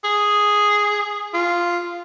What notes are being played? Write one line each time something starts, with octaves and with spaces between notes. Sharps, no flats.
G#4
F4